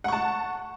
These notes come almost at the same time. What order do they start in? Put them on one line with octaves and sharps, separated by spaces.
F#5 C#6 A5